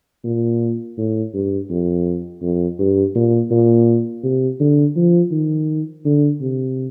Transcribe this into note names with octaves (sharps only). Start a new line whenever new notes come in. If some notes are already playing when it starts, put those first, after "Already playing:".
A#2
A2
G2
F2
F2
G2
A#2
A#2
C3
D3
F3
D#3
D3
C3